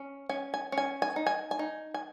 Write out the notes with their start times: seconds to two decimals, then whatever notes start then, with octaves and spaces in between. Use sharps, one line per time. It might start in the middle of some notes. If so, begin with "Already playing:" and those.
Already playing: C#4
0.29 C#4 G#5
0.54 G#5
0.72 C#4
0.78 G#5
1.02 G#5
1.16 D#4
1.27 G#5
1.51 G#5
1.59 D#4
1.94 G#5